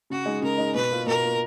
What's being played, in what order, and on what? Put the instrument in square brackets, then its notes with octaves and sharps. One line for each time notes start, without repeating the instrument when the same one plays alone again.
[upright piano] C#3 [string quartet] F#4
[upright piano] G#3 D#4
[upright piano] C#3 [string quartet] A#4
[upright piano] G#3 D#4
[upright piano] B2 [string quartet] B4
[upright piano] A#3 F4
[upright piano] B2 [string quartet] A#4
[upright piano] A#3 F4